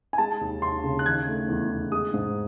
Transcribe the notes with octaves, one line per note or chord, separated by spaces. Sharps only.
G#5
G#3 A5
D#2
D#2 C6
C#3
F#6
D#3 G#6
A3
E2
E2
G#3 D#6
G#2